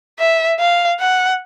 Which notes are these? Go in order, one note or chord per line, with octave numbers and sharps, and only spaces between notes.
E5
F5
F#5